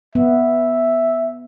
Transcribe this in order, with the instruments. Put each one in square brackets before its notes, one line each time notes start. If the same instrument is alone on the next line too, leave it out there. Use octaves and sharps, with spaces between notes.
[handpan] B3 [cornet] E5